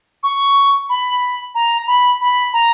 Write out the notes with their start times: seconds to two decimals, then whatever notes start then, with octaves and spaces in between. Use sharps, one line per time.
0.23 C#6
0.89 B5
1.55 A#5
1.87 B5
2.21 B5
2.53 A#5